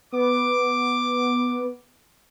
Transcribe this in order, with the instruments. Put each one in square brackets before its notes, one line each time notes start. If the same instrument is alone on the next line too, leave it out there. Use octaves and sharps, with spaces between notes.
[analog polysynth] B3 [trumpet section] D6